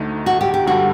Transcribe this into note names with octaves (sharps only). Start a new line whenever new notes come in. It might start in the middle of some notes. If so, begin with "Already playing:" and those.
Already playing: D2 D3 A3 D#4
F#4
G4
G4
G2 D3 G3 F#4